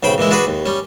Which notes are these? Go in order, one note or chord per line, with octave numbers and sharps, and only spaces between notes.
B1 C#3 C5 G5 B5
A#2 E3 G#3 E4
D4 F#4 G#4 B4 B5
D#2
G3 C#4